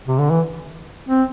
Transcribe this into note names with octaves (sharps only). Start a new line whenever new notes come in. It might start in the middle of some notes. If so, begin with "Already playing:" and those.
C3
D3
E3
C4